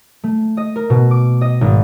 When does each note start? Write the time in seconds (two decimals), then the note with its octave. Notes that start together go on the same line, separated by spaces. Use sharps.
0.24 A3
0.57 D#5
0.76 A#4
0.90 B2
1.11 D6
1.41 D#5
1.61 G#1